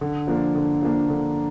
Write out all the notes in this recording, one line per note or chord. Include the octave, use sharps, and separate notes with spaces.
D3
F3 A#3 D4
D3
F3 A#3 D4
D3